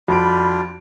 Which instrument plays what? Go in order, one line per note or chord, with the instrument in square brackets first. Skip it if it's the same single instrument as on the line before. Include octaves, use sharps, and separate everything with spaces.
[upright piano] F2 D7 [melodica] G3 D4 F4 [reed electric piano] F#4 [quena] B5